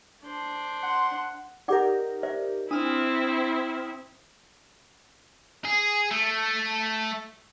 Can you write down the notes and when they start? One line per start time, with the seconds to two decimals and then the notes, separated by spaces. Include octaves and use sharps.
0.24 D4 C5
0.83 F#5 C6
1.68 D#4 G4 A#4 D5 F#5 D6
2.23 C5 D5 E5
2.71 C4 D4 E4 D#6 F6
5.65 G#4
6.11 A3